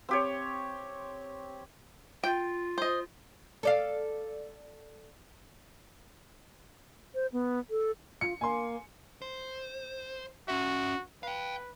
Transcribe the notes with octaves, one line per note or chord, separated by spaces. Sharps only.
C4 G4 C#5
F4 G5
C5 D#5
A4 D5 F5
C5
B3
A4
F4 C#7
A#3 G#5 C6
C5
C#4 F#4 E5
B4 F5 G5